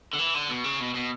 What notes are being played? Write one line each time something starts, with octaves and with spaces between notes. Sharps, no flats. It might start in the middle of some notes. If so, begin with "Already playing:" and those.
D3
E3
D3
B2
C#3
B2
B2